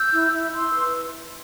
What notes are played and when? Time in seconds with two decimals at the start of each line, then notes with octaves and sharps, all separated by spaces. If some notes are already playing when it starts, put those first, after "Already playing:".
Already playing: E6 G6
0.12 E4
0.32 E4
0.53 E4 C6 E6
0.74 B4